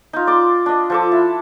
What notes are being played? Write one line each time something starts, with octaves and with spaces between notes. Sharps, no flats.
D#4 F4
D5 C6 D6
D4 D#5
F3 A4 D6
E4